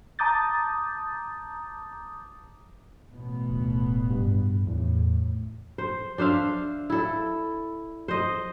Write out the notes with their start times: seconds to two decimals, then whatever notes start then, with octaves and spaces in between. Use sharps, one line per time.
0.19 A5 A#5 D6 D#6 G6 A6
3.09 A1 B2 B3
3.50 D1
4.10 G2
4.67 E2 A2
5.78 C5
6.18 D4 C5 E5 F5
6.90 E4 A4
8.08 C5 D#5